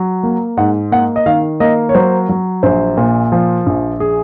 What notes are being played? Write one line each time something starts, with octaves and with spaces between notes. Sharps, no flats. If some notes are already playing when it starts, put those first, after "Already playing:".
Already playing: F#3
A#3
G#2 F#5
A#3 F#5
D#5
D#3 F5
A#3 D#5
C#5
F#3 C5
F#3
A#1 C5
A#2
F3
A#1
G#4